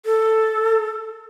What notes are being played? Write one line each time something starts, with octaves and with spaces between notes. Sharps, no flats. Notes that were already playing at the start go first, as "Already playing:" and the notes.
A4